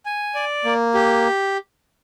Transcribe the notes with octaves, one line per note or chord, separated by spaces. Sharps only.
G#5
D5
A#3
G4